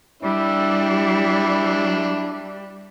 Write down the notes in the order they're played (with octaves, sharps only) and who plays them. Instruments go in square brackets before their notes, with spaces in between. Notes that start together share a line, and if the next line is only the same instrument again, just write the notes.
[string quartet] G3 [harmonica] D4 E4